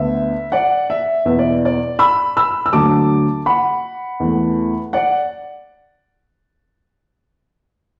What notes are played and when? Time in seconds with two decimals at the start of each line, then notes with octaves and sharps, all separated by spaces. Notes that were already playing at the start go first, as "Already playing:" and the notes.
Already playing: D2 D3 B3 E5
0.52 D5 F#5
0.90 E5
1.25 E2 B2 B3 E5
1.39 D5
1.65 D5
1.99 B5 E6
2.37 B5 E6
2.66 E6
2.73 D2 D3 F#3 A3 A5 D6
3.46 F#5 B5
4.20 E2 E3 A3
4.93 D5 F#5